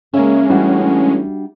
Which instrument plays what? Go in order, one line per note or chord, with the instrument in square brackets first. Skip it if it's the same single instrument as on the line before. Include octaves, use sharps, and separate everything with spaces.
[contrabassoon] C#3 [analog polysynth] G#3 C#4 [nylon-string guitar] A#3 E5
[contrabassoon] A1 [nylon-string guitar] G3 D4 F#4